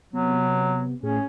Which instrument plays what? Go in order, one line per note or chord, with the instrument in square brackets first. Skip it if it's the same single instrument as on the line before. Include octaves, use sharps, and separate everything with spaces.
[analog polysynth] C3 B3 [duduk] F#3
[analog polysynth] A2 G#4 [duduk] C#4